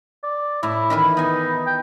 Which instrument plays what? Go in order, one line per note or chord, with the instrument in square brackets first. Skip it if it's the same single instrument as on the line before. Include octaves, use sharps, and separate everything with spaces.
[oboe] D5
[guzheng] A2 [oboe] E4
[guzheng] D#3 E3 B4
[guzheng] B3 G#5 [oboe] D#4
[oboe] G5